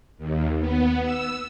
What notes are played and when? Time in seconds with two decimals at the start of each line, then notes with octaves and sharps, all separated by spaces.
0.18 D#2
0.59 B3
1.03 E6